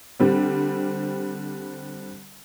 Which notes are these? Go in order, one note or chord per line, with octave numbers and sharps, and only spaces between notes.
D3 G3 C4